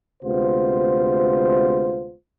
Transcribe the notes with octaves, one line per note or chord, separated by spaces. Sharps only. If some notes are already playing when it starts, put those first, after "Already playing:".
D2 C3 G#3 B3 F4 C5